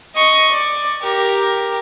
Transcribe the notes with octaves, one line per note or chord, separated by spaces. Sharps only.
D#5 C#6
D5
G4 A#4